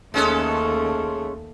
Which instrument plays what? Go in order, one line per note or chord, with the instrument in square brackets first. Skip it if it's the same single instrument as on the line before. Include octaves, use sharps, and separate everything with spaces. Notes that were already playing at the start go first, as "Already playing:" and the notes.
[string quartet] D#2 A3 [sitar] G#3 C#4 A4